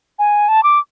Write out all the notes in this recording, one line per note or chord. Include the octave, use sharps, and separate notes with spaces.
G#5
A5
D6